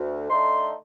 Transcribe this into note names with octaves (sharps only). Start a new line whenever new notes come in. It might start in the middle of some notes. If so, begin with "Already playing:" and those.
Already playing: D2
D3 A3 D#4 C6